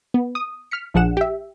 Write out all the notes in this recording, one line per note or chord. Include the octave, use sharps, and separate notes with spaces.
B3
D#6
F6 B6 C#7
A#1 F3 D4 G#4 F#5 E7
G4 E5